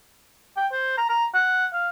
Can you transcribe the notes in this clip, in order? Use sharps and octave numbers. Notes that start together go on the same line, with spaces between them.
G5
C5
A#5
A#5
F#5
F5